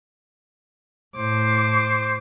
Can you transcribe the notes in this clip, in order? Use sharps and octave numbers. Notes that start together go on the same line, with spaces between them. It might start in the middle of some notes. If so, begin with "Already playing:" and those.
A2 C5 D6